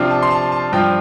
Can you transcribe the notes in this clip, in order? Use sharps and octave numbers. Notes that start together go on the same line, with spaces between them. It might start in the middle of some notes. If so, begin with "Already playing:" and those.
Already playing: C3 F3 D4 F4 G5
A5
C6
A5
A5
G2 F3 D4 F4 G5